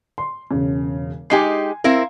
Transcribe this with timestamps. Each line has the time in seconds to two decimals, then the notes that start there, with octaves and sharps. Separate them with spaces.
0.18 C6
0.51 E1 C#3
1.30 G#3 D#4 G4 G#5 C7
1.84 C4 E4 A#4 F5